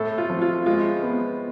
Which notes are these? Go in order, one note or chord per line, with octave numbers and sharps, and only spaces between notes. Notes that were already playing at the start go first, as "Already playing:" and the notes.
Already playing: A2 A4
F4
F3
F4
G#3 F4
B3